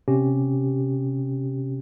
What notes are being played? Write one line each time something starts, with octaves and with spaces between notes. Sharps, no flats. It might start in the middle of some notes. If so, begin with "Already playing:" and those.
C3 C#4 G4